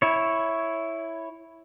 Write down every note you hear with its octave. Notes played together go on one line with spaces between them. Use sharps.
E4 C#5